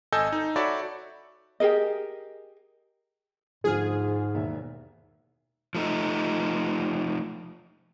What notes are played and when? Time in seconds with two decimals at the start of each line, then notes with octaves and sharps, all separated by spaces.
0.12 G#1 A4 D#5 G#5 E6 G6
0.32 D#4
0.56 F#4 A4 C#5 D5 E5 B5
1.60 G4 G#4 A#4 D#5
3.64 D2 G#2 F3 G#4 F6
4.34 E1 D#2 E5
5.75 F3 A3 D#4